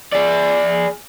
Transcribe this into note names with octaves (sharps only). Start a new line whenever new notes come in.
G#4 D5